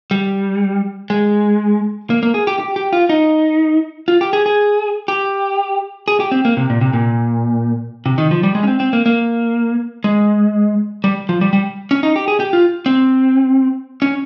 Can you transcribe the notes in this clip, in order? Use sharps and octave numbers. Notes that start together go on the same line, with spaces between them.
G3
G#3
A#3
A#3
G#4
G4
G4
G4
F4
D#4
F4
G4
G#4
G#4
G4
G#4
G4
C4
A#3
C3
A#2
C3
A#2
C3
D#3
F3
G3
G#3
C#4
C4
C4
A#3
A#3
G#3
G3
F3
G3
G3
C#4
D#4
G4
G#4
G4
F4
C4
C#4